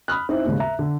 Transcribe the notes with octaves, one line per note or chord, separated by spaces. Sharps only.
B5 D#6 F6 F#6
C4 D#4 E4
D#2 G#2 C#3
E5 A#5
D3